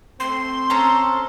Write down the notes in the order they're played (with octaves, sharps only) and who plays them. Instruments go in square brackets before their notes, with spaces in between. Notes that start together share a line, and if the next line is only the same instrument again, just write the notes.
[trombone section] A3 C4 [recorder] C6
[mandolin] C#4 A4 A#5